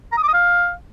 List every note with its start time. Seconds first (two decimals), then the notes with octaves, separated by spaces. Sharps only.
0.12 A#5
0.17 D#6
0.23 D6
0.28 D#6
0.33 F5